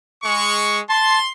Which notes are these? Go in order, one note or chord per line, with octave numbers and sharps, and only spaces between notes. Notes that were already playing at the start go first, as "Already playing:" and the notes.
G#3 C#6
A5 C6